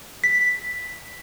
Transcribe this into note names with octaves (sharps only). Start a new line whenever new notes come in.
B6